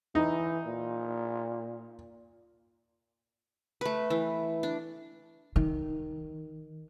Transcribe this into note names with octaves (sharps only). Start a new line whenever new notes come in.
E3 D#4
A#2
A3 B4
E3
D4
D#3